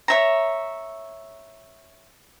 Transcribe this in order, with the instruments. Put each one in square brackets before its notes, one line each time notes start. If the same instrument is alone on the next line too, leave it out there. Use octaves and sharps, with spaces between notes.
[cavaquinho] C#5 E5 A#5